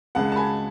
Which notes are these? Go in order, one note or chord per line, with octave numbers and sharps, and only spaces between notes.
C#2 C#3 G#3 F#5 A5
A5
G#5 B5